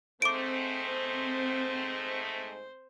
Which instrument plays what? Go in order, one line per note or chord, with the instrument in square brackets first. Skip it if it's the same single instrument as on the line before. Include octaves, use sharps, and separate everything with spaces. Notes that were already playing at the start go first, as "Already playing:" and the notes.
[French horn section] G#2 A3 [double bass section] C4 [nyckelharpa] C5 [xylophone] D6 D7